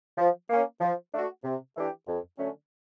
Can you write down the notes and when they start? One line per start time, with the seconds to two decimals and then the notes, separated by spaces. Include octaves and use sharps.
0.18 F3
0.50 A#3 C#4
0.80 F3
1.13 A3 D4 F#4
1.43 C3
1.76 E3 A3 D4 G4
2.07 F2
2.38 D3 F#3 A3 C#4